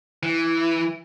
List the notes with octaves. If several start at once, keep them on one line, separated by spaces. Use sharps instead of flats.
E3